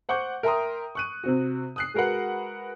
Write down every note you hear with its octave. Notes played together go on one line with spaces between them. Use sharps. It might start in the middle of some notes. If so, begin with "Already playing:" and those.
C5 F#5 C#6 D6 G6
A#4 E5 G5 A#5 C6 D#6
C#6 F#6 D#7
C3 C4 F#4
D#6 F#6 C7
G#3 F#4 A#4 B4 F#5